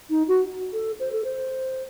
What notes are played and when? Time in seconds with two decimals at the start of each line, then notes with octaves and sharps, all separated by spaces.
0.10 D#4
0.28 F#4
0.73 A4
1.00 C5
1.12 A4
1.24 C5